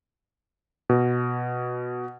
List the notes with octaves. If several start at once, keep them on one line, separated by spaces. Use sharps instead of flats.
B2